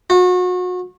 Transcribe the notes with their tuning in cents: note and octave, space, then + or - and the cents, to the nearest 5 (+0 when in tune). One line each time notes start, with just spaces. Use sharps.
F#4 -35